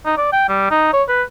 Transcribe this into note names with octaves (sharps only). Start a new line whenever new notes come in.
D#4
D5
G5
G3
D#4
C#5
B4